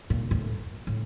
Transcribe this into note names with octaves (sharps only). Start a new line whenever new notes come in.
A#2
A2
A2